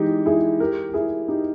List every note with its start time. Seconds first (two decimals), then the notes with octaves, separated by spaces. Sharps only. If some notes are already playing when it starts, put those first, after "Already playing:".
Already playing: E3 G#3 D#4 G4
0.26 E4 G#4
0.60 G4 A#4
0.89 G4
0.94 E4 G#4
1.28 D#4 G4